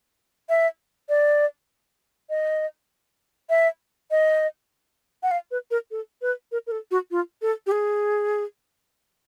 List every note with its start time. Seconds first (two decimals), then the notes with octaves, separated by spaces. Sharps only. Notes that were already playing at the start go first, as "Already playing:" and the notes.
0.49 E5
1.09 D5
2.30 D#5
3.50 E5
4.11 D#5
5.23 F#5
5.31 F5
5.51 B4
5.71 A#4
5.91 A4
6.22 B4
6.52 A#4
6.67 A#4
6.71 A4
6.91 F#4
7.11 F4
7.42 A4
7.67 G4
7.72 G#4